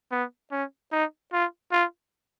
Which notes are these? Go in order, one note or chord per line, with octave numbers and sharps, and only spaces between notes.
B3
C#4
D#4
F4
F4